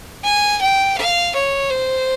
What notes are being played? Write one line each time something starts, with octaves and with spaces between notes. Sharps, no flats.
G#5
G5
F5
C#5
C5